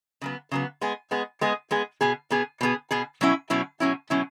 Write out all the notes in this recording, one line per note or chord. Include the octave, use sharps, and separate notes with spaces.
C#3 F#3 B3
C#3 F#3 B3
G#3 B3 G#4
G#3 B3 G#4
G#3 B3 G#4
G#3 B3 G#4
B2 B3 G#4
B2 B3 G#4
B2 B3 G#4
B2 B3 G#4
B2 F#3 C#4 E4
B2 F#3 C#4 E4
B2 F#3 C#4 E4
B2 F#3 C#4 E4